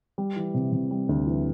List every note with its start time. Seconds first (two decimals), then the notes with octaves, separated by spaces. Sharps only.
0.18 G3
0.36 E3
0.54 C3
0.72 C3
0.91 G3
1.09 D2
1.26 E3